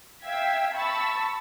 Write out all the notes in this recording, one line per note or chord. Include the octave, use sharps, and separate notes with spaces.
E5 F5 G5 E6 G#6 B6
A5 B5 C#6 E6 A6